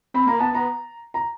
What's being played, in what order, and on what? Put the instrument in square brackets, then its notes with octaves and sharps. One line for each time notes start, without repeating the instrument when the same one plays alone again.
[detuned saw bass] C4 [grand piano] B5
[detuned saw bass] A#3 [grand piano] A#5
[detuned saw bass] B3 [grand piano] A5
[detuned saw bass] B3 [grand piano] A#5
[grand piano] A#5